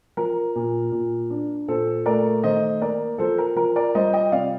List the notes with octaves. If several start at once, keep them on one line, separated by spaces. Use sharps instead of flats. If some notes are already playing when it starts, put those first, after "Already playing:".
F3 A#4
A#2
A#2
D4
A#2 A4 C5
A3 A#4 D5
D#3 C5 D#5
A#3 A#4 D5
F3 A4 C5
A#4
F3 A#4
A#4 D5
G3 C5 D#5
D#5 G5
C3 D5 F5